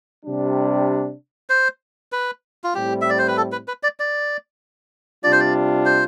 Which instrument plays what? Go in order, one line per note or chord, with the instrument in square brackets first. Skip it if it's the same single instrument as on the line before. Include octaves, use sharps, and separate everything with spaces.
[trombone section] C3 G3 D4
[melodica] C5
B4
F4
[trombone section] A2 G3 C4 E4 [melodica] G4
[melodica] E5
D5
C5
B4
A4
B4
B4
D5
D5
[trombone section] C3 G3 D4 F4 [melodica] D5
[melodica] C5
D5
C5